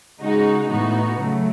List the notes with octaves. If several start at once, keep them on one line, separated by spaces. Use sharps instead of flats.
C#3 G#3 D#4 F#4
A2 E3 B3 D#4 F#4
C#3 F#3 A3